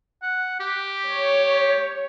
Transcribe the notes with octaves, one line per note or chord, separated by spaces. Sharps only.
F#5
G4
C#5